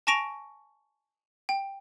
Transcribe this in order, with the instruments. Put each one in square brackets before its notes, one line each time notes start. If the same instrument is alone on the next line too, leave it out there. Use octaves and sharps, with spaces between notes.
[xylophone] G#5 A5 C#6 A#6 D7 F7
G5